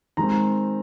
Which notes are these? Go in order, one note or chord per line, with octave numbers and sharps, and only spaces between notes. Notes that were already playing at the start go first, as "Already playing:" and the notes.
D#3 G#3 C4 A#5